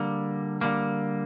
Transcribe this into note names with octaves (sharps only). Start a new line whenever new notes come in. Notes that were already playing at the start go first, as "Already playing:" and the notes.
Already playing: D3 G3 A#3
D3 G3 A#3